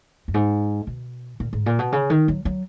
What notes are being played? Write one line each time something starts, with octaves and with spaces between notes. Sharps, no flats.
F#2
G#2
B2
A#2
G#2
A#2
B2
C#3
D#3
F#3
F#3